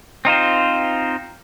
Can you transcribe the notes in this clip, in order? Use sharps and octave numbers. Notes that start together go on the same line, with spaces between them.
C4 D#4 F4 C5